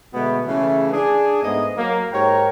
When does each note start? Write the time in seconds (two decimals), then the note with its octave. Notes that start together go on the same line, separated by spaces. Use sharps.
0.14 B2 D3 G#3 A3 B3
0.48 C#3 E3 A3
0.93 D4 G#4
1.43 G#2 A3 B3 D#5
1.78 F#3 A#3
2.13 G#2 G4 A#4 C#5 G5 A#5